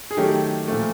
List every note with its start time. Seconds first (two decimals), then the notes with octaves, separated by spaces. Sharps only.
0.11 G#4
0.17 D#3 F#3 A3 G4
0.68 A#2 F3 A3